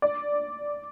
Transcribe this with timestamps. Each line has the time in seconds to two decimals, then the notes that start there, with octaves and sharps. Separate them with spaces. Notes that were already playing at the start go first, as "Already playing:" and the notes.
0.02 D5